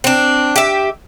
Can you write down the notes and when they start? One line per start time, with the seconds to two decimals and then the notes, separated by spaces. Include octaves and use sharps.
0.04 C4 D4
0.56 G4 E5